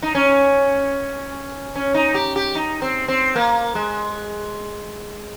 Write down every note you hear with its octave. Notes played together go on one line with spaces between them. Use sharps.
D#4
C#4
C#4
D#4
G4
G4
D#4
C4
C4
A#3
G#3